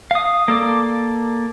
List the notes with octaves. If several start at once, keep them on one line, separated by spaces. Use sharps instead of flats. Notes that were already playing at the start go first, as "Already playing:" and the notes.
F5 D#6
A#3 A4 D5 D6